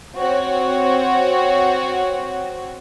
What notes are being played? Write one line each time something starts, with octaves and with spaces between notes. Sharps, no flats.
C4 F#4 C#5